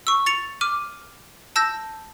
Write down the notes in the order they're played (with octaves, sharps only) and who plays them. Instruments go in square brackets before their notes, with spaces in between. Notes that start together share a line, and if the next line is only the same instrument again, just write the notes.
[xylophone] C#6 E6
A6 C#7 F7
D6 F6 D#7
A5 E6 G6 A#6